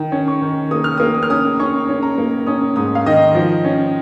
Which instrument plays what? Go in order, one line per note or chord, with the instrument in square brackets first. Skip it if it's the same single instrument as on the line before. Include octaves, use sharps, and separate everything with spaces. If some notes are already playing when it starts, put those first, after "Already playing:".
Already playing: [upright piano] D#3
C#4
C#6
D#3
A#3 D#6
F6
A#3 D#6
D#6
F6
C#4 D#6
C#4 C#6
C#4
A#5
A#3
C#4 D#6
G#2 D#6
F5
D#3 D#5
F3
C#4